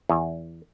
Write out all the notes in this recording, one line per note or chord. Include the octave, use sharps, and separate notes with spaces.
E2